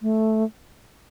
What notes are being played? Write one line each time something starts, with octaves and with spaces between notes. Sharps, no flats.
A3